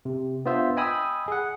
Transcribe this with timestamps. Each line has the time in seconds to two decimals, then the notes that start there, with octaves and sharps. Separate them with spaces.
0.05 C3
0.45 B3 D4 F4 C5 E5
0.77 D#5 G5 G#5 B5 D#6 E6
1.28 G#4 F#5